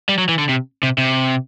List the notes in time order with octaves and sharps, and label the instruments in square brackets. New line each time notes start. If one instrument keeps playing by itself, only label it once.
[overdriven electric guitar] G3
F#3
E3
D3
C3
C3
C3